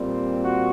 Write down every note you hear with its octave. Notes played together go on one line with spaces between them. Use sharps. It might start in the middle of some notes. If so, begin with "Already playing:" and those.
Already playing: A#2 G3 C4
F#4